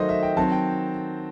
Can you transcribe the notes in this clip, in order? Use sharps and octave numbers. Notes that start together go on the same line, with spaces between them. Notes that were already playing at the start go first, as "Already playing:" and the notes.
Already playing: D#3 F#3 A3 C5 D#5
E5
G5
D#3 F#3 C4 A5
G5